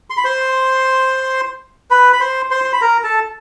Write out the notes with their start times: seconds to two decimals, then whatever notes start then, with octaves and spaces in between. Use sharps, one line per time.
0.10 C6
0.17 B5
0.24 C5 C6
1.91 B4 B5
2.13 B5
2.21 C5 C6
2.51 C5 C6
2.64 C6
2.73 B5
2.81 A#4 A#5
3.04 A4 A5